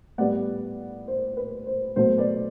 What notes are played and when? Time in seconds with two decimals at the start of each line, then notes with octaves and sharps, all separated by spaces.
0.18 A2 G3 B3 D5 F#5
1.08 C5
1.37 B4
1.66 C5
1.96 B2 F#3 A3 C5
2.18 B4 D5